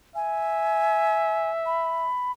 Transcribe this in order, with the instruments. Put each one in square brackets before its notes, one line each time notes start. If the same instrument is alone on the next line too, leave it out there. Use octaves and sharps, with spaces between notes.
[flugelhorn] E5 [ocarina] G#5
[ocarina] B5